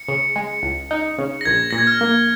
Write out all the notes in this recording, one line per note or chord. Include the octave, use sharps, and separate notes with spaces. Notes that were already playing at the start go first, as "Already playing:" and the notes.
Already playing: C#7
C#3
G#3
C#2
D#4
C#3
A#6
A#1 G#6
A#2 A#6
G#6
F6
A#3